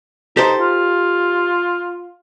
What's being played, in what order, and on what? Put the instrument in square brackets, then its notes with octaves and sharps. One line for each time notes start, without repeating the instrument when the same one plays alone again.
[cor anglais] D#4 [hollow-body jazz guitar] G4 A4 C5
[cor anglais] F4